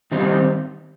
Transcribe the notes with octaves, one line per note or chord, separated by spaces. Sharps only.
D#3 G3 C4 D#4